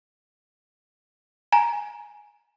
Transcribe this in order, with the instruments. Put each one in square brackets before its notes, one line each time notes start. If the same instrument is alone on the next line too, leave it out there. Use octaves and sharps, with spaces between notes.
[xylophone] G#5 A#5